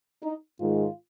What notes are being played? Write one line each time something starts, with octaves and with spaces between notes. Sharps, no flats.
D#4
G#2 D#3 G#3 F4